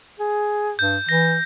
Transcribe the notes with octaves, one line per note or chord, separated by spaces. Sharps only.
G#4
G2 G6
E3 A#6